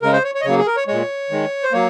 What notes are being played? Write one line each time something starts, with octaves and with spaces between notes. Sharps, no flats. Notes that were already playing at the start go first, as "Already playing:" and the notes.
C#3 G#3 A#4
C5
C#5
C#5
D#5
C#3 F#3 A#3 C#5
G#4
A#4
C#5
A#2 G#3 C#5
D#3 G#3
C5
F#3 A#3 C#5